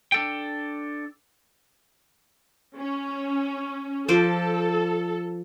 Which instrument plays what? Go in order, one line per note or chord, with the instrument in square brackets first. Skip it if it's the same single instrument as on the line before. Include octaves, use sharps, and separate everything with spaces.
[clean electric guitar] D4 A4 G5
[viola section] C#4
[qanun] F3 C5 D5 [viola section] A4